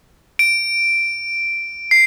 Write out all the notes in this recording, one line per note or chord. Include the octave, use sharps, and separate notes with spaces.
D7
C7